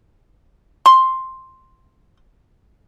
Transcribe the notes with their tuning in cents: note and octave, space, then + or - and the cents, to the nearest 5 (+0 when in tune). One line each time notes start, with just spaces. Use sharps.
C6 +5